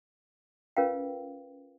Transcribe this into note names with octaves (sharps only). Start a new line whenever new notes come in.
C#4 F4 A#4 B4 F5 G5